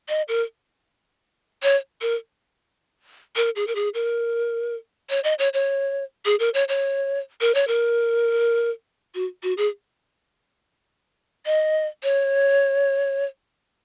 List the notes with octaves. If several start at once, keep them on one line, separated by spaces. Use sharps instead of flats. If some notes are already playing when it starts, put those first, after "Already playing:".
D#5
A#4
C#5
A#4
A#4
G#4
A#4
G#4
A#4
C#5
D#5
C#5
C#5
G#4
A#4
C#5
C#5
A#4
C#5
A#4
F#4
F#4
G#4
D#5
C#5